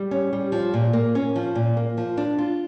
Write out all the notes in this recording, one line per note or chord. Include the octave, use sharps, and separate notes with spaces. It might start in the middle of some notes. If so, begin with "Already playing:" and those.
Already playing: G3
C#4
G3
F3
A#2
A#3
C#4
F3
A#2
A#3
F3
D4
F4